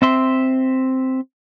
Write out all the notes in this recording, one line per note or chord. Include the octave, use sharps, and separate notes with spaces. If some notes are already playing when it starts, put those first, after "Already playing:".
C4 E5 C6